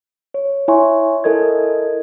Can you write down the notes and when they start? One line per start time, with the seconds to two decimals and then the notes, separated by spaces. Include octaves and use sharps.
0.34 C#5
0.68 E4 C#5 E5 G#5 C6 C#6
1.24 E4 A4 A#4 D#5 G#6